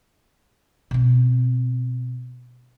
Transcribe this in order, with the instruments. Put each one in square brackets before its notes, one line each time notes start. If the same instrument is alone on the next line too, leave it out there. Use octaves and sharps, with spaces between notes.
[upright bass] B2 C4